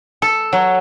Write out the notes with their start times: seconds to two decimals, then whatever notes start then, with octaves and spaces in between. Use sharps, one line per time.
0.22 A4
0.53 F#3